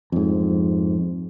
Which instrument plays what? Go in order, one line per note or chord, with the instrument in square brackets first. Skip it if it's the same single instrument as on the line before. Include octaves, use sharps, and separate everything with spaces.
[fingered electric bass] F2 G#2